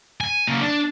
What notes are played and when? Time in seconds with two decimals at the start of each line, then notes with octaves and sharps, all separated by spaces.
0.21 G#5
0.47 C#3 A#3
0.61 D4